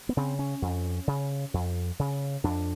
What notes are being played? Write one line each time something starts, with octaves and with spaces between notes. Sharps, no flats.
B3
C#3 C4
C#4
F2
C#3
F2
C#3
F2 D4